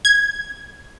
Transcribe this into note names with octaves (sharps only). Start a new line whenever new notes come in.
G#6